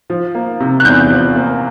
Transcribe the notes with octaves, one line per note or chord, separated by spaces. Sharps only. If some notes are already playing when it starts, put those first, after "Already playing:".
F3
A#3
C3
F#6
E2 G6
F3
A#3